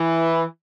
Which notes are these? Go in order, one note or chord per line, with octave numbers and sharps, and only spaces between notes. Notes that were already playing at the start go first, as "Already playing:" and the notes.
Already playing: E3